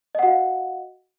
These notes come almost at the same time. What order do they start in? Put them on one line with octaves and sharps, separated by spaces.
D#5 F#5 F#4 F5